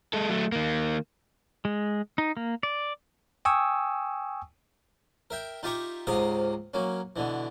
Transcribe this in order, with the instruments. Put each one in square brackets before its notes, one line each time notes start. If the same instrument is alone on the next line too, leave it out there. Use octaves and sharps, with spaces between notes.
[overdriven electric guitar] G#3 A4
F#3 A3
D#3 A#3
[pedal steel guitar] G#3
D#4
A#3
D5
[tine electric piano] G5 G#5 C#6 D#6 E6
[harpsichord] A#4 E5 G5
D#4 F4 G4 E5 A#5 C#6
C#2 G#2 C3 A#4 F5 D#6
F#3 A#3 C#4
B2 D3 E3